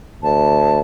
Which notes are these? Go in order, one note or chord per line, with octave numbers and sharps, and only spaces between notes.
D2 A5